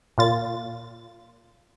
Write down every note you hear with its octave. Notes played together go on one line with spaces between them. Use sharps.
A#2 F4 A6